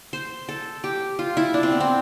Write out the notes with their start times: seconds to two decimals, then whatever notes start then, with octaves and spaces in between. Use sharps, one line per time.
0.13 C5
0.49 A4
0.84 G4
1.19 F4
1.37 E4
1.54 D4
1.63 C4
1.72 B3
1.80 C4